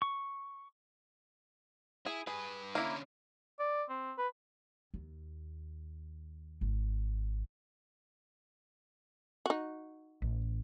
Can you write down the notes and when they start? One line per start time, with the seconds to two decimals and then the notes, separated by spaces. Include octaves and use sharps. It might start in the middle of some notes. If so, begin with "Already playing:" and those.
0.02 C#6
2.06 E4 G#4
2.27 G2 G#4 B4
2.75 D3 A#3 C#4 E4
3.59 D5
3.89 C4
4.18 B4
4.94 D#2
6.61 G#1
9.46 D#4 F#4
10.22 A1